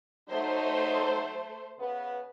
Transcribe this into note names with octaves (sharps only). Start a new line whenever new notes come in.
F#3 A3 D#4 C5
C#3 B3 B4